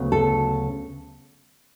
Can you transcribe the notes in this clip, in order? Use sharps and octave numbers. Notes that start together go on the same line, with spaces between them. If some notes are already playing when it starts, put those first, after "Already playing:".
Already playing: D2 C#3 F#3 B3
A4